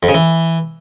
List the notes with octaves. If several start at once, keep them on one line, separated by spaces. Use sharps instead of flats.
F2
C#3
E3